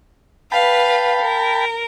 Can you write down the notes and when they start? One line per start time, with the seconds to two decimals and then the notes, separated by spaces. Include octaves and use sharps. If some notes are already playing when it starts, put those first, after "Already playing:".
0.52 B4 F5 G5 A5 B5
1.22 A#4